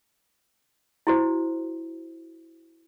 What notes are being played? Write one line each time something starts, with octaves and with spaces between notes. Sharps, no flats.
E4 F#4 C5